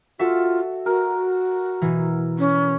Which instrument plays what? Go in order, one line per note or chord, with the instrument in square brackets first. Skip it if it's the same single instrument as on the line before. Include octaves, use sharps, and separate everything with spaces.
[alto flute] F4 [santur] F#4 [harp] A4 E5
[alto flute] F#4 [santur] A#4
[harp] B2 E3
[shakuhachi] C#4